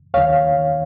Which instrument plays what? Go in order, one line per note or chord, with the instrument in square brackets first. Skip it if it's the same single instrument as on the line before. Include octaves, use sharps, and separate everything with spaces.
[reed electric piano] D#2 D#3 C#5 F5